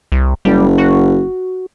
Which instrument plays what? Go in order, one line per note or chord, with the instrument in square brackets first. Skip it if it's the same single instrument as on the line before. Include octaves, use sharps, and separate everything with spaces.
[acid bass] C2
[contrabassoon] F#1 [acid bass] G3
[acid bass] F#4